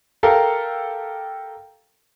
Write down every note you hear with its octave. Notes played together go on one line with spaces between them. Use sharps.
G4 A4 A#4 F5